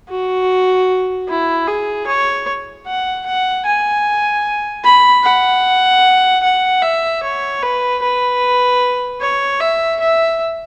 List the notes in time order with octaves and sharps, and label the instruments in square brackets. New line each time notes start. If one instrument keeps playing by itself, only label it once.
[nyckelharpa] F#4
E4
G#4
C#5
F#5
F#5
G#5
B5
F#5
F#5
E5
C#5
B4
B4
C#5
E5
E5